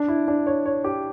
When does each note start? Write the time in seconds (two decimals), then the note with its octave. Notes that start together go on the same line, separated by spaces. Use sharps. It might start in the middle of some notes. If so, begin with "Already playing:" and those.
Already playing: D4
0.08 E4
0.28 D4
0.47 C#5
0.66 C#5
0.84 G4